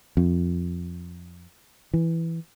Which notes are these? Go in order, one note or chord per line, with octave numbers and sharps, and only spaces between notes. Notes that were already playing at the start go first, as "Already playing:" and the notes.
F2
E3